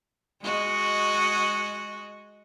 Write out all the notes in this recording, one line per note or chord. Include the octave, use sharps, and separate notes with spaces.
G#3 F#4 D#5